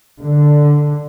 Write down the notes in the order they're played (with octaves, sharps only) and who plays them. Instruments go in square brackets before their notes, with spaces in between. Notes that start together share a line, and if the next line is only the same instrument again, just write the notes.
[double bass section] D3